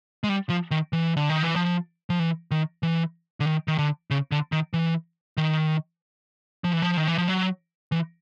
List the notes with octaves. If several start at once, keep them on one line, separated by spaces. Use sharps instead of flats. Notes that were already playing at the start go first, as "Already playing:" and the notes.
G#3
G3
F3
D#3
E3
D3
D#3
E3
F3
F3
E3
D#3
E3
D3
D#3
D#3
D3
C#3
D3
D#3
E3
D#3
F3
E3
F3
D#3
E3
F3
F#3
E3